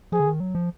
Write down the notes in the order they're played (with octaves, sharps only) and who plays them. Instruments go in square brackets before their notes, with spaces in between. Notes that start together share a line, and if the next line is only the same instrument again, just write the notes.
[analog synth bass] F3 [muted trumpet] G#4
[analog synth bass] D3
D#3
F#3
F3